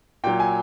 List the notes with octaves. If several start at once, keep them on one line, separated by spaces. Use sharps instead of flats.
A#2 F#3 G5
G#5